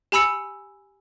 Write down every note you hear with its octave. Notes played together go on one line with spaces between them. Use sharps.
G4 G#5 B5 E6 C#7